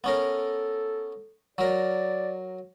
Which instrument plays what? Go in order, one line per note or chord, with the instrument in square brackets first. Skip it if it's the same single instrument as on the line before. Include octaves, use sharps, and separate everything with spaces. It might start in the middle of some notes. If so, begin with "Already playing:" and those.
[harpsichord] B3 C#4 A#4 [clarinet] A4
[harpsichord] F#3 A#4 [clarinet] D5